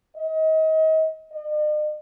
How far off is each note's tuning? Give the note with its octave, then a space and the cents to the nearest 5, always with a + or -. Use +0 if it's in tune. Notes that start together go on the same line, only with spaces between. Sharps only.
D#5 +30
D#5 -45